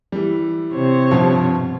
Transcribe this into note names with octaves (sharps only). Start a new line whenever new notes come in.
E3 G3
C3 C5 C#5
G2 B2 F3